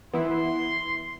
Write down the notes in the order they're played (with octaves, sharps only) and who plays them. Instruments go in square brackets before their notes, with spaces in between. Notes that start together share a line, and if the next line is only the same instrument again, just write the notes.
[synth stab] E3 B3 E4 [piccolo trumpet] C6